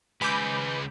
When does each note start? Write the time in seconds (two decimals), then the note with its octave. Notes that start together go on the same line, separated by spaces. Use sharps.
0.22 C#2 G#3 B4 G#5 B5 D6 G6